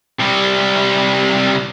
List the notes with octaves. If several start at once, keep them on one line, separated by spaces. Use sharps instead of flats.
C3 G3